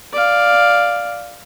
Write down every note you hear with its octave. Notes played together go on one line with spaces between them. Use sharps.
D5 F5